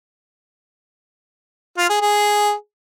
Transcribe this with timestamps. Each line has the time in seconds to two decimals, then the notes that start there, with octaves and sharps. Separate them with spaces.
1.77 F4
1.89 G#4
2.01 G#4